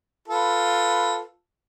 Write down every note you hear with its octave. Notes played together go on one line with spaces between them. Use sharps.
F4 A4 B4